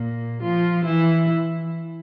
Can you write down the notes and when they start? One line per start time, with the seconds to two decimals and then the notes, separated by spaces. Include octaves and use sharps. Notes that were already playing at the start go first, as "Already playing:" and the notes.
Already playing: A#2 A#3
0.43 F3 F4
0.85 E3 E4